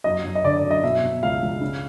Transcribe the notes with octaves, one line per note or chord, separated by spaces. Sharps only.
F#2 D#5
F#2
D#5
D3 D5
D5
F#2
D#5
B2 E5
B2
C#2 F5
C#2
C#3